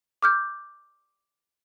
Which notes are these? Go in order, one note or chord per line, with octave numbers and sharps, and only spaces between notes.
D6 F6 G6